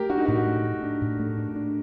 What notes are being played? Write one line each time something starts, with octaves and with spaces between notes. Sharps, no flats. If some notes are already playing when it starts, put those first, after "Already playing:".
Already playing: A3 G4 A#4
D4 F#4
D#4
A2 F#4
A3
A3
D4
A2
A3
D4
D4